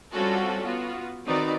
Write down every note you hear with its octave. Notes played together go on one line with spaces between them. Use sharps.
G3 C4 C#4 F4 F#4 A4
B3 F4 F#4
D#3 C4 D#4 F#4 B4 D5